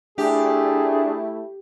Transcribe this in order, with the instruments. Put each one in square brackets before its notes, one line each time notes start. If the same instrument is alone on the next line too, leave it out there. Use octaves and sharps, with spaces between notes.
[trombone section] A3 E4 [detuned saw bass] D4 [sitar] G4 [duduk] G#4